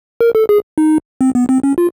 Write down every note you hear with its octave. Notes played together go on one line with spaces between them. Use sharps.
A#4
A4
G#4
D#4
C4
B3
C4
C#4
F4